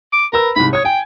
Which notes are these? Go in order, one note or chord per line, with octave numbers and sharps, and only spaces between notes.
D6
A#4 B4 B5 E6
C2 G#2 B5
C#5 D#6 G#6
G5 G#5